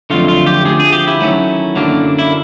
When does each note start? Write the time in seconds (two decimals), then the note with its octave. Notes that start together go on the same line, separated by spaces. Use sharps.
0.10 F2 D3 F#3 A3 F4
0.28 F4
0.46 G4
0.65 D3 F3 A3 G#4
0.80 G#4
0.92 G4
1.07 E4
1.20 D#3 F#3 A3 C#4
1.75 F#2 D3 F#3 A#3 D4
2.19 E4